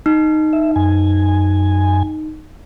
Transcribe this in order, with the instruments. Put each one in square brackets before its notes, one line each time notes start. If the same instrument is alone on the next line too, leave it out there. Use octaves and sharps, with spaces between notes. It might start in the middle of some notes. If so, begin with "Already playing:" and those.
[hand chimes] D#4
[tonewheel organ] E5
F#2 G#5